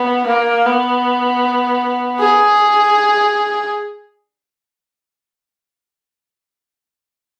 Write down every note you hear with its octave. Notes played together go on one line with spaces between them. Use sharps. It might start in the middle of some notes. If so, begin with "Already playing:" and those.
Already playing: B3
A#3
B3
G#4